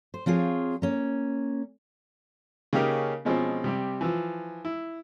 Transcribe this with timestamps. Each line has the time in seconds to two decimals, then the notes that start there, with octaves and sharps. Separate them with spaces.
0.14 C5
0.26 F3 C4 F4 G#4 C#5
0.82 A#3 C#4
2.73 C#3 A#3 C#4 D#4 G4 A#4
3.25 B2 F3 G#3 C4 C#4
3.64 C3 G3 G4
4.01 E3 F3
4.65 E4